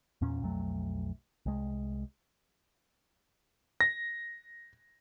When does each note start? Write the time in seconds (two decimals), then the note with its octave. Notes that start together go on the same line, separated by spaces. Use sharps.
0.21 E2 A#2 C#4
0.42 B1 F2 F#3 A3
1.46 C2 G#3
3.81 A#6